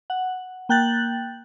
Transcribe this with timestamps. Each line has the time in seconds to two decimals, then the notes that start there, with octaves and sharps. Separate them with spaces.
0.10 F#5
0.69 A#3 G5 F#6 G6 A6 F#7